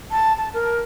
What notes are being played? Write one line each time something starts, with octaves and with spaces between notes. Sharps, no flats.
A5
A5
A#4